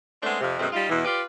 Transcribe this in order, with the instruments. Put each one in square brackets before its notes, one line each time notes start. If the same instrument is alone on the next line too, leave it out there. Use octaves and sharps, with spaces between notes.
[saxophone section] G#3 A3 B3 C4 D4
F2 C3
F#2 B2 G#3 A3 C4
G3 D#4 F4
E2 B2 E3
F4 G4 B4 D5